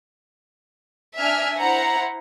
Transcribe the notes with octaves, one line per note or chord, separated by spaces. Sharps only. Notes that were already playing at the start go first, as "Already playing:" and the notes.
D4 E5 G#5 F6
E4 C5 F#5 A#5